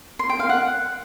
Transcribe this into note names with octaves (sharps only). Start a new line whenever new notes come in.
C6
G5
F5
F#5